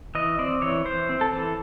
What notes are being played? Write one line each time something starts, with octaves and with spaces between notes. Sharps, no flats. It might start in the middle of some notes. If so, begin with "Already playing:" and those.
E3 D#5
C4 D5
E3 C#5
E3 C5
C4
A4
E3